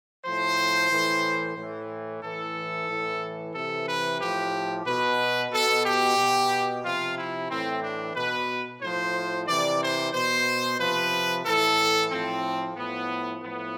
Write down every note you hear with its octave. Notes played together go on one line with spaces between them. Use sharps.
A2 F3 C5
A2 E3
A2 E3
A2 E3 A4
A2 E3
C3 E3 A4
B4
A2 F3 G4
B2 B4
B2 A4
G4
B2
C3 F3 F4
E4
A2 E3 C4
D4
B2 B4
A2 F3 C5
C3 E3 D5
C5
B2 C5
C3 F3 B4
A2 E3 A4
A2 F3 C4
A2 F3 B3
A2 F3 B3